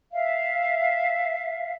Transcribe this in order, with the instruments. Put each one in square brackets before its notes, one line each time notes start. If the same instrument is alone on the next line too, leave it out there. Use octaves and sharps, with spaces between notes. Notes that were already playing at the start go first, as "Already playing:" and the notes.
[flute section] E5 F5